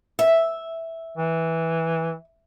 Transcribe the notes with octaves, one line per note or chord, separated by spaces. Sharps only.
E5
E3